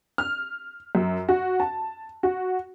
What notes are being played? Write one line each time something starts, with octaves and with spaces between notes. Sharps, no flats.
F6
F#2
F#4
A5
F#4